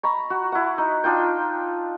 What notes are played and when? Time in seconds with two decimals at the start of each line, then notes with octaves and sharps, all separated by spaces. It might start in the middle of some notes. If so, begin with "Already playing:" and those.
0.03 A#5 B5 C#6
0.30 F#4
0.52 E4 F#5
0.78 D#4
1.04 D4 D#4 F4 G5